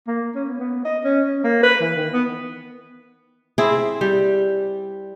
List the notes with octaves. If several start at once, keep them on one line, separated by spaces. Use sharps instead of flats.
A#3
C#4
B3
B3
D#5
C#4
C#4
A#3
B4
E3
D#3
B3
C4 E4 G#4
G3